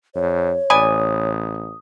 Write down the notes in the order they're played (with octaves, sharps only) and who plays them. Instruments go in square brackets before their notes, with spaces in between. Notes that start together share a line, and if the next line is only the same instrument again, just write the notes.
[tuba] F2 [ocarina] C#5
[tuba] A1 [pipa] B4 D5 G#5 [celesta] D#6